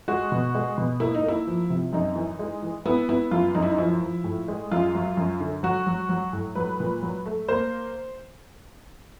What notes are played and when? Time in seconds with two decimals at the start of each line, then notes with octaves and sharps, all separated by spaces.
0.08 G#3 F#4
0.32 B2
0.55 G#3
0.78 B2
1.00 A#3 E4
1.15 D#4
1.23 A#3
1.28 E4
1.47 F3
1.70 C3
1.93 F#2 D#4
2.16 E3
2.39 G#3
2.62 E3
2.86 B3 E4
3.09 B3 E4
3.31 F#2 F4
3.55 F#2 D#4
3.62 E4
3.71 D#4
3.78 F3 E4
4.02 F3
4.24 A2
4.48 G#3
4.71 F#2 F4
4.95 F#3
5.17 F#2
5.40 D3
5.63 F#3 F#4
5.87 F#3
6.09 F#3
6.33 A2
6.55 F#3 B4
6.80 A#2
7.02 F#3
7.26 A3
7.48 A#3 C5